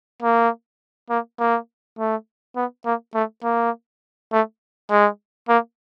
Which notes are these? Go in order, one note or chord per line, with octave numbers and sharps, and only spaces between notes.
A#3
A#3
A#3
A3
B3
A#3
A3
A#3
A3
G#3
A#3